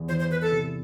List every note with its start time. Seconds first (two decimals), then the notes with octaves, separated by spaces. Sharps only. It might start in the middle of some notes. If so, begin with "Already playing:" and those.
Already playing: E2
0.08 E3 C5
0.19 C5
0.31 E3 B4
0.42 A4
0.52 C3